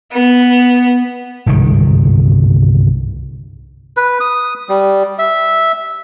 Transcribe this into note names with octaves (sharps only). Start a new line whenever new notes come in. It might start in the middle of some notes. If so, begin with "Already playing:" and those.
B3
G1 C2 G#2 D#3
B4
D#6
G3
E5